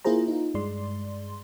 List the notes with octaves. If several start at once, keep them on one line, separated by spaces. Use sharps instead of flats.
A#3 E4 F4 G#4 C5 A#5
D#4 F4
G2 G#3 D5 C6